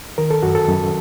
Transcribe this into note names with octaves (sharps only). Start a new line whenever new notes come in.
D#3 A#4
A4
F#2 F#4
A4
F#2